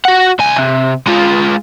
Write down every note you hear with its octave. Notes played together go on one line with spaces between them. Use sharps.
F#4 F#5
C#2 G#5
C3
G#3 F4